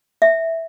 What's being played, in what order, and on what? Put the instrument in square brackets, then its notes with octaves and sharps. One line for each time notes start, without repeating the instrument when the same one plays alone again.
[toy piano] E5